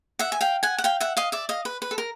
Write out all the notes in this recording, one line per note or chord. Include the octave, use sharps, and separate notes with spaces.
E5 F#5
G#5
F5 G5
F#5 G#5
F#5
F5 G5
E5 F#5
D#5 F5
D5 E5
D#5 F5
B4
B4
A4
A#4